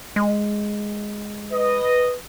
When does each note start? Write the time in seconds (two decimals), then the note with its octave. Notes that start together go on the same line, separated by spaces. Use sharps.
0.16 G#3
1.51 B4 D#5